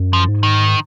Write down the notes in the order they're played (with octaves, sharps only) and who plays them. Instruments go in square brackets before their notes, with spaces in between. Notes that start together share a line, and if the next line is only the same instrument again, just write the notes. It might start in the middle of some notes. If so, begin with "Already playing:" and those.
Already playing: [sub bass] F#2
[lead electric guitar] F3
[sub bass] G#2
[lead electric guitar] D#3